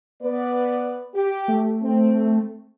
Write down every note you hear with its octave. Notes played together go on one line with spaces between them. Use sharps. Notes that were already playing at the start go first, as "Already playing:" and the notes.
B3 B4 D5
G4
A3
C4